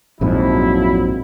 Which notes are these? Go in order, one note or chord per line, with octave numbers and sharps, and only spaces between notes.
A#1 F2 G#2 F3 F#3 E4